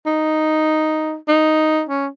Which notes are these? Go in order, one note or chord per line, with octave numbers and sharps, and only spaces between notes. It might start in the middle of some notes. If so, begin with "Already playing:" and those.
D#4
D#4
C#4